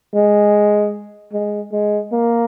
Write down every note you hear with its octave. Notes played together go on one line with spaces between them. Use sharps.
G#3
G#3
G#3
A#3